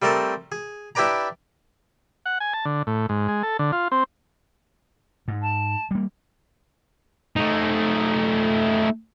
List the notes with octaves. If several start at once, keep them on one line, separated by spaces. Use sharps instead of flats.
G3 A3 C4 A#4 A5
G#4
D4 E4 G4 B4 D5 A#5
F#5
G#5
A5
D3
A2
G#2
G#3
A4
D3
F4
C4
G#2
A5
G3 A#3
A3 D#4